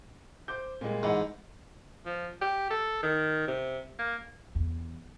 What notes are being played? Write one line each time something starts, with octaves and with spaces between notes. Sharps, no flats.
C5 D6 G6
A#2 G3 G#3
G#2 E3 D#5 F#5
F3
G4
A4
D#3
C3
A#3
E2